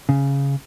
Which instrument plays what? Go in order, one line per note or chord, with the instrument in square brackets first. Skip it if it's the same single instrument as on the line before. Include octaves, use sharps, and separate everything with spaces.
[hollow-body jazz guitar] C#3